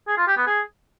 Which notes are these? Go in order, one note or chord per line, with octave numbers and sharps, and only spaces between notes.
G#4
F4
G4
B3
G#4